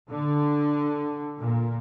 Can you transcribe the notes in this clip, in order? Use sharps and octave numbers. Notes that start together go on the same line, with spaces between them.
D3
A#2